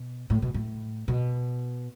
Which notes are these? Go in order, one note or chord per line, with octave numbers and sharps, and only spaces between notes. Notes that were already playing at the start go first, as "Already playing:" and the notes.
Already playing: B2
A2
B2
A2
B2